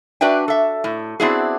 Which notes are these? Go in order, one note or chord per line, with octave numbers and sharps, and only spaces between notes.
D4 F#4 B4 D5 E5 G5
A4 E5
A2
B3 C4 D4 E4 F#4 G#4